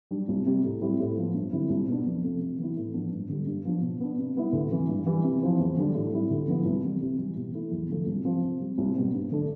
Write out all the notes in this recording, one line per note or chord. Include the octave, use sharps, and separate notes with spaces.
G3 D4
C2
C3 G3
A2
G3 C4 E4
A2
F3 B3
G2
D3 G3 C4 E4
C2
B2 B3 D4
F2
C3 F3 A3
C3
E3 B3 E4
A2
F3 B3 D4
G2
D3 G3
G2
F3 B3 D4
B2
B3 D4
C3
G3 B3 E4
D2
C3 E3
G2
E3 G3
C3
F3 C4 E4
E2
D3 G3 D4
A2
G3 C4 E4
D2
D3 F3 B3 E4
C2
C3 E3 G3
C3
E3 G3
B2
A3 E4
E2
D3 F3 A3
C2
C3 F3
C3
G3 C4
C2
B2 G3 C4
G2
D3 A3 D4